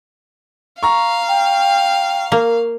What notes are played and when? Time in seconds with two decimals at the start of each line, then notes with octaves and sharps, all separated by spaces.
0.83 F5 A#5 C#6
1.28 G5
2.32 A#3